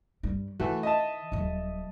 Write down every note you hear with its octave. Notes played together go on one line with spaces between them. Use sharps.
G2 G3
D#3 E3 A3 F#4
D#5 E5 A5
D#1 F#3